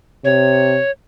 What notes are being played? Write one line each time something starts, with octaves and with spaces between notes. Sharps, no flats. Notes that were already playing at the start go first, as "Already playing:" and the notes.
C3 C#5